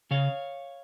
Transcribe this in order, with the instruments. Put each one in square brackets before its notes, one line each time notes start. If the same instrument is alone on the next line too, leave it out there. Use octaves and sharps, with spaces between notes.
[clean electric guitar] C#3 C#5 F5